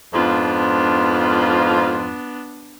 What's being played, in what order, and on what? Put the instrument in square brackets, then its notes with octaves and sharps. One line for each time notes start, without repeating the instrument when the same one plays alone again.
[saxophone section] F2 G#2 F4 [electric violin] B3 D4